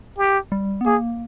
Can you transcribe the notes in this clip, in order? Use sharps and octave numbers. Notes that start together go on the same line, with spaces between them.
G4
G3
B3
A#3 G#4